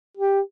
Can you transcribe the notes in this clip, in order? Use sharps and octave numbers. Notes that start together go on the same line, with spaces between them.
G4